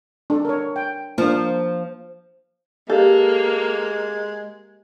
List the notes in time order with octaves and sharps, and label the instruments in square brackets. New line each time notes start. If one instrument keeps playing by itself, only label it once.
[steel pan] D4 A4
A#4 C#5
G5
[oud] F3 [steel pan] A#3 D4
[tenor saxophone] G#3 [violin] A#3 [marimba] G4 F5 [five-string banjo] A4